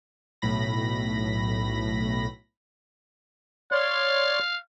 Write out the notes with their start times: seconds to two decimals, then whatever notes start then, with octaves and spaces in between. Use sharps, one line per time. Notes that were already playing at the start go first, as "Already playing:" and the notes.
0.42 B1 A2 B5 A#6
3.72 C#5 D5 F5 C6